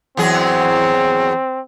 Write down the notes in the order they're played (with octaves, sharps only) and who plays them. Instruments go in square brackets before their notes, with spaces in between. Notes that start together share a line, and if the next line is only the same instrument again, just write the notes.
[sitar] E2 F#3 G#4 [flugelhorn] C4